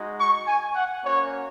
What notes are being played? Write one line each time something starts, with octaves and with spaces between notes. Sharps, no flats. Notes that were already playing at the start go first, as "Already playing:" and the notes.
Already playing: G#3 D#4 F#4
C#6
G#5
F#5
A#3 C#4 F#4 C#5